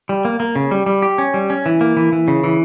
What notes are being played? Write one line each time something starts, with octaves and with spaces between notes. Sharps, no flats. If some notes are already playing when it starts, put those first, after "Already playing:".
G3
A#3
A#3
C#3
G3
G3
G4
C#4
G3
C#4
E3
A#3
E3
E3
C#3
E3